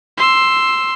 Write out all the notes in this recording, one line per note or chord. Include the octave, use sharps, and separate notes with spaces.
C6 E6